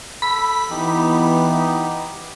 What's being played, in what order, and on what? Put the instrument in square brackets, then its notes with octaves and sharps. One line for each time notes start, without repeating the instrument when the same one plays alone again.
[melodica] A4 [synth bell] B5
[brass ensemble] E3 B3 [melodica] D#4 G4